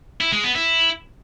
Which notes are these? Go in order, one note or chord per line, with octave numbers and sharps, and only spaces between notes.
E4
G#3
B3
E4